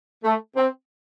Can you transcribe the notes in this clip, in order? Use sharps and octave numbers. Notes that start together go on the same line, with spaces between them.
A3
C4